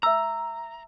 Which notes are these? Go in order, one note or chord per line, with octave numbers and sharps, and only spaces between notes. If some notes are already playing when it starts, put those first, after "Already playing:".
E5 A#5 E6